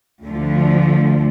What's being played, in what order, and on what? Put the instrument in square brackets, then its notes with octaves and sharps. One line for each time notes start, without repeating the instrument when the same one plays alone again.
[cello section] D2 D3 F3 A3